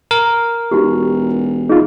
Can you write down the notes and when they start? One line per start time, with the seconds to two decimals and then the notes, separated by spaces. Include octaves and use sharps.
0.11 A#4
0.71 E1 D#4 F#4 G4
1.70 D#4 F4 G#4